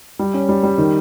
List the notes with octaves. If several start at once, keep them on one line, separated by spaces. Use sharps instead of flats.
G3
C#4
G3
G3
D#3